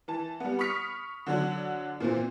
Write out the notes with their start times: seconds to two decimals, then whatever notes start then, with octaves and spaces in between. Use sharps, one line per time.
0.08 E3 A5
0.40 G3 B3
0.59 B5 C#6 D#6 F6 B6 C#7
1.26 D3 F#3 D4
2.00 A#2 E3 A#3 C4